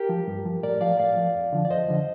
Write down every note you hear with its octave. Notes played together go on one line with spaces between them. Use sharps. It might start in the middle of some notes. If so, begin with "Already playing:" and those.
Already playing: G4 A#4
F3
G2
F3
A2 A#4 D5
F3 D5 F5
A2 D5 F5
F3
F2
D3 F3
D5
F2 C5 D#5
D3 F3